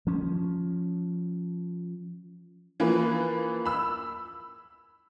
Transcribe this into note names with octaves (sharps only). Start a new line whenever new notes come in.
F3 C#4
E3 F3 A#3 B4
B5 E6